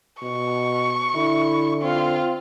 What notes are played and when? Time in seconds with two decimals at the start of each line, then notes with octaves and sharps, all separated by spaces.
0.22 B2 C#6
1.15 D3 E4
1.82 C4 F4